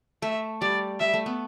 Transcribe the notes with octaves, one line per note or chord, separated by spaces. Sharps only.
A3 E5
G3 D5
G3 E5
A3
B3